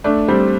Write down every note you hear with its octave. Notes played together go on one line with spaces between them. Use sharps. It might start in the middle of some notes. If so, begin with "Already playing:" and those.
A3 D4
G3 C4